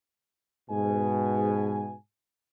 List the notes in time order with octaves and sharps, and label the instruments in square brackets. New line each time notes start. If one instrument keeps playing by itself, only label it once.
[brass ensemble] G#2 B2 G#5